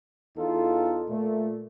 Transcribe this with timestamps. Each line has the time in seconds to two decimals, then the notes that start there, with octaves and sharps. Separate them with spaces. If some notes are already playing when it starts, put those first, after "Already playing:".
0.36 E2 B3 D#4 F4 A4
1.08 A#2 A3